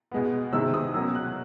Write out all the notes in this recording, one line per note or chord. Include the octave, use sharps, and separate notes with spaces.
B2 G#3 B3
C3 D#3 G#3 C4 E6
D#6
B2 F#3 A#3 C#4 E6
F#6